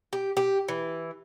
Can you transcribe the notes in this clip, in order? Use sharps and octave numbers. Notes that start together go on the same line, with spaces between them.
G4
G4
E3